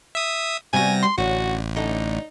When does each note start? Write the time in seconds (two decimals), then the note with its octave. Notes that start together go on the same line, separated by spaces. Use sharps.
0.15 E5 D#6
0.73 C3 G3 B3 F#4 G#5 A#6
1.03 C6
1.18 A1 D3 C#4 F#4
1.76 D3 A3 C#4 D#4